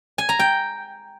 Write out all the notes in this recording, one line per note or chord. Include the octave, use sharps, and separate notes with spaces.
G#5
A#5
G5